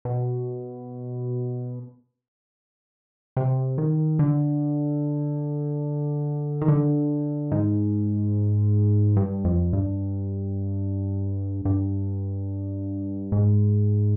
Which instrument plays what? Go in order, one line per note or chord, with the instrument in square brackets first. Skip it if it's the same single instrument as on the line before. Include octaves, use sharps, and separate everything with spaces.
[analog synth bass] B2
C3
D#3
D3
D#3
D3
G#2
G2
F2
G2
G2
G#2